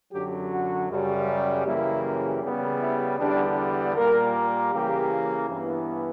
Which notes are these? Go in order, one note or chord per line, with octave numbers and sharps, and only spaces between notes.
F#2 D3 F#3 G4
F#4
F#2 C#3 G3
F#2 C#3 E3 G3 A#3 E4
C#3 G3 B3
E4
E2 D3 G3 B3 D4
A#2 G3 A#3 A#4
C#3 E3 A#3 G4
G2 E3 B3